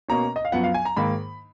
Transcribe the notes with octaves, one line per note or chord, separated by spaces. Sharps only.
B2 A#3 C#4 A#5
D#5
F5
F#2 F3 B3 F#5
F5
G#5
A#5
G#2 D#3 A#3 B5